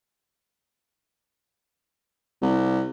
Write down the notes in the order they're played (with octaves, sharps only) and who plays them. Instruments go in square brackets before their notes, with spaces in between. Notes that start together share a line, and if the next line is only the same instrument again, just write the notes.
[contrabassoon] C2